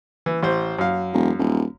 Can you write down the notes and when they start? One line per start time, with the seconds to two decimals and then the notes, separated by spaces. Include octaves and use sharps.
0.26 E3
0.43 A1 C5
0.79 F#2 F5
1.13 E1
1.39 D#1